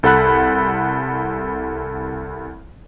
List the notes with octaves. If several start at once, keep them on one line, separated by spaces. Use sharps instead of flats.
C2 A4 F#5 B5 F#6